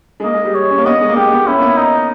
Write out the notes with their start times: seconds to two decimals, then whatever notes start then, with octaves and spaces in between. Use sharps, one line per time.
0.20 G#3
0.24 A#3 D#5
0.34 G#3
0.45 G3
0.55 C#5
0.70 C#4
0.78 A#3
0.85 B3 D#5
1.01 G#3
1.09 A#3
1.16 G#3 G4
1.32 B3
1.47 C#4 E4
1.58 A#3
1.62 B3
1.77 D#4